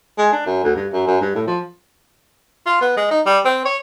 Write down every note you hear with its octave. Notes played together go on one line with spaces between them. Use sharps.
G#3
D4
F#2
D2
G2
F#2
F#2
G2
A2
F3
F4
B3
G#3
D#4
G3
C4
C#5